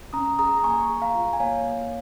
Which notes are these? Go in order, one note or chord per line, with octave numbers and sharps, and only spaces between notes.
C#4 A#5 D#6
G#4 A#5 D#6
A#5
A#3 G#5 C#6
G#4
F5 A#5
F4
G#5
A#3 C#5 F5
A#3